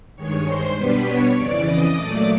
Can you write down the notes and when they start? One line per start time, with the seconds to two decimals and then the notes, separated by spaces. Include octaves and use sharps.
0.16 G2 D#3 G#3 C#5 C#6
0.46 C5 C6
0.76 B2 G3 B3 D4 B4 B5
1.05 C#5 C#6
1.35 F2 C#3 E3 D5 D6
1.65 D#5 D#6
1.94 A#2 F#3 A3 D5 D6